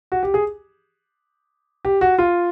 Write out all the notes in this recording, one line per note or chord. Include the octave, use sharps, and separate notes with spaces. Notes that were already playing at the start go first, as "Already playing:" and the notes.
F#4
G4
G#4
G4
F#4
F4